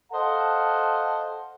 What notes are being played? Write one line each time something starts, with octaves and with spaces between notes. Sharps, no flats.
A4 C5 D#5 F5 F#5 A5